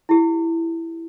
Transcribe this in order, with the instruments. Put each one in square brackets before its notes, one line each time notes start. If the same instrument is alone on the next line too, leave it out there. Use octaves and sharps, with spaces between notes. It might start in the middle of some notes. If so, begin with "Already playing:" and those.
[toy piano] E4 G4